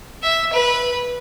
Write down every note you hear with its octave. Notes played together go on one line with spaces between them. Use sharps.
E5
B4